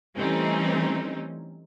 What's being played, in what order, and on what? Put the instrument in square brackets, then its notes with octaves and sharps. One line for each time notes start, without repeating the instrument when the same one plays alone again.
[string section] E3 G3 A3 C4 C#4 D#4